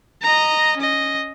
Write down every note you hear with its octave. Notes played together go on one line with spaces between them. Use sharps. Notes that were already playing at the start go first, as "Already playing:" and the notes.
D#5 A#5
C#4 D#5